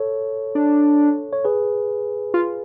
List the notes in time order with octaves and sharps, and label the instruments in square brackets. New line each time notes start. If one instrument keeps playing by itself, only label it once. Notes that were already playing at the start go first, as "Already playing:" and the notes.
Already playing: [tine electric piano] A4 C#5
[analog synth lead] D4
[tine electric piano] C#5
G#4 B4
[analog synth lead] F4